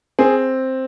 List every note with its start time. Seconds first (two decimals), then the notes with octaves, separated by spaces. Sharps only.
0.19 C4 G#4